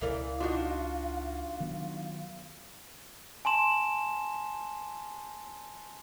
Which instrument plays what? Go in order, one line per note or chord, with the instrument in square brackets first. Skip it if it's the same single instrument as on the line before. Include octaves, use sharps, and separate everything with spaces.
[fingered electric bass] C#2 [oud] E3 A#4 D5 [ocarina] F5
[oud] D4 D#4 [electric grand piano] F4 F#4
[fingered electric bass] D#3 F#3 B3
[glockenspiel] G#5 A5 C6 E7